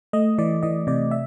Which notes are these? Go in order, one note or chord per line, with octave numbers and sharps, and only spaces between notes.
A3 D#5
E3 D5
E3 D#5
C3 D5
E5